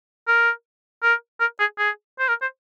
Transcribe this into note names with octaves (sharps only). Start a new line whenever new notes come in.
A#4
A#4
A#4
G#4
G#4
C5
A#4
C5